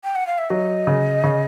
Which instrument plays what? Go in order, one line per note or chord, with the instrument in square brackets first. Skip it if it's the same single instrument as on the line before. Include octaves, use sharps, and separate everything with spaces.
[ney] G5
F#5
F5
E5
[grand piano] F#3 [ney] D#5
[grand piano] C#3
C#3